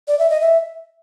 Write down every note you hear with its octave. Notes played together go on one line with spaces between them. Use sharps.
D5
E5
D#5
E5